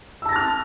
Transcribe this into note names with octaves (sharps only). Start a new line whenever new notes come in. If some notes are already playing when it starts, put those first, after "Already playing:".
A5 E6 F6 A6 A#6